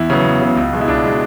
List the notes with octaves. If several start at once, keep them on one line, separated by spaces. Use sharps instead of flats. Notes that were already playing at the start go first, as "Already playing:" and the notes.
Already playing: E2 E4
C#3 F#3 B3
E2
C#3 F#3 B3
C#2
B2 G#3
E4
C#2 D4
B2 G#3